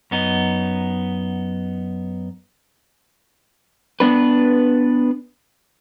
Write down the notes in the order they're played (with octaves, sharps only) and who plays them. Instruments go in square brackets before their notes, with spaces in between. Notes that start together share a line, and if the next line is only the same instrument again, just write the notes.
[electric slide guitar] F#2 B3 D#4
B3 D4 B4